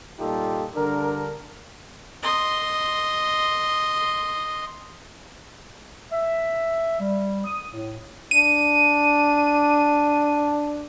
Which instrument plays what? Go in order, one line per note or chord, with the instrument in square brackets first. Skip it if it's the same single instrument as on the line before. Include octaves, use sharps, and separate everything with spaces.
[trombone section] A#2 G3 D#4 F4 G4 A4
G2 D3 D4 A#4
[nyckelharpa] D#5 C6
[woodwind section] E5
G3
D#6
A2
[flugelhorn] D4 [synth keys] D#7